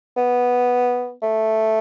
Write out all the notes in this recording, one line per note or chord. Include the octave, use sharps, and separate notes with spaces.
B3
A3